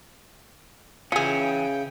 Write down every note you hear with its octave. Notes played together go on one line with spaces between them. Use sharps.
C#3 E3 C#4 F4 G#4 G5